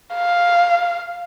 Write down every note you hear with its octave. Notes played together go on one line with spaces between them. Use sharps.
F5